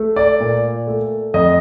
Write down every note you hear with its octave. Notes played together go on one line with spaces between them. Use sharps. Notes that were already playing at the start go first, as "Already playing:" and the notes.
Already playing: A3
D5
A#2
A3
F2 D#5